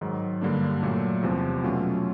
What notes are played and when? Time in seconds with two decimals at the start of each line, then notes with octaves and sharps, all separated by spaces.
0.01 G#2 D#3 F#3
0.41 G2 D3 G3 A#3 D4
0.83 A#2 F#3 A3
1.23 E2 C3 F3
1.63 B2 F#3 A3 C#4 F4